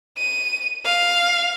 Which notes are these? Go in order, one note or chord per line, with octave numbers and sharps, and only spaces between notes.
D#7
F5